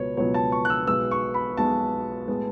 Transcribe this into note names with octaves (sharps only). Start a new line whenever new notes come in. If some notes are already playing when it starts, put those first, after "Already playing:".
Already playing: C#2 B2 F#3 B3 C#5
C#2 B2 F#3 B3 C#5
A5
C#6
F#6
E6
B1 B2 G#3 B3 E6
C#6
B5
B1 B2 G#3 B3 A5
A2 G#3 B3